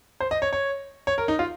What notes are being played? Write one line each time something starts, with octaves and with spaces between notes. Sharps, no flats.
C5
D#5
C#5
C#5
C#5
A#4
D#4
F4